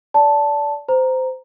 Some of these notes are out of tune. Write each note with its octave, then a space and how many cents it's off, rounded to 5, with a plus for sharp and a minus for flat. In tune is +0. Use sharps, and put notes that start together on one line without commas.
D5 -25 A5 +0
C5 -20 A#5 +0